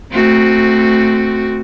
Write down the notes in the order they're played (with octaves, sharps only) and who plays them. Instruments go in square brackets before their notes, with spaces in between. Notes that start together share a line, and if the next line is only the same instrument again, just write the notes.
[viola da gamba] A3 C4 F#4